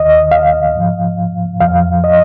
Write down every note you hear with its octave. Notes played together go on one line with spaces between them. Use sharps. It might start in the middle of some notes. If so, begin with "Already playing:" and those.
Already playing: D#2 D#3 D#5
F5
G#2 F3
F2 F3 F5
D#5